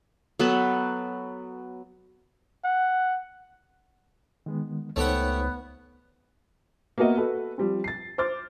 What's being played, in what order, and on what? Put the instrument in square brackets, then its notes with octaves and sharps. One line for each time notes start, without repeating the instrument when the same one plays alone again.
[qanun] F#3 B3 A4 B4
[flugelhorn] F#5
[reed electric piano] D#3 G#3 B3
[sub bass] C#2 [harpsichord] A3 G4 F#5 [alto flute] B3 [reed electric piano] D#4 C5 C#5
[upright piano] A#3 B3 F#4 A#4 D#5 E5
F#4 A4 B4
F3 G3 C4
A6 C7
C5 D6 F6 A6